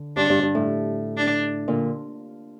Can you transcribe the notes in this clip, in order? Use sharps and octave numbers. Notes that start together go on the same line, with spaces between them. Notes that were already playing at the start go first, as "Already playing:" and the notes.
Already playing: D3
G2 D4
G2
G2
A2
D4
A#2 D3